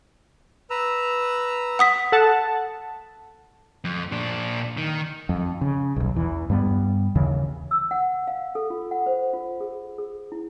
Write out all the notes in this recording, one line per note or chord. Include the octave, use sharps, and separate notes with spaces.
B4 A#5 E6
F#5 D#6 B6
A4 F#5 A5
F2
A#2 D4
D#3
F2
C#3
D#1 B1
E2 E3
G2 G3 B3
D#2 C#3 E3
E6
F#5
F5
A4
F4
F#5
C5
F4
G#4
G#4
E4